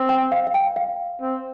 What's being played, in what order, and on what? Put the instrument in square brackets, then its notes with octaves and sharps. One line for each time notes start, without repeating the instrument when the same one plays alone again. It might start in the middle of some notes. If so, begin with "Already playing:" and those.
Already playing: [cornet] C4
[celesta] G5
F5
F5
G5
F5
[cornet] C4